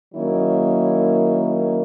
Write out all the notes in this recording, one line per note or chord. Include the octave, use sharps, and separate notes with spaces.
D#3 F#3 A#3 C#4 E4